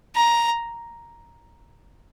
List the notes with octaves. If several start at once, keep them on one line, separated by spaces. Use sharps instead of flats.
A#5